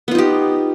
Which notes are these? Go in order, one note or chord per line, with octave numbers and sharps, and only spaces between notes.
B3 D#4 F4 G4